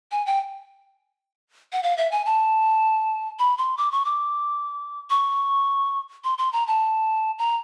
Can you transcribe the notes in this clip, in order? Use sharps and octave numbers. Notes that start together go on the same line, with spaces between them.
G#5
G5
F#5
F5
E5
G#5
A5
B5
C6
D6
C#6
D6
C#6
C6
C6
A#5
A5
A#5